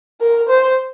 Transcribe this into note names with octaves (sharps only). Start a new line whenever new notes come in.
A#4
C5